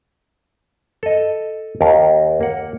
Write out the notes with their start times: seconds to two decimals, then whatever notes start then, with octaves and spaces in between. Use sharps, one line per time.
1.03 A4 D#5
1.81 D#2 A#4
2.41 A#3 F#5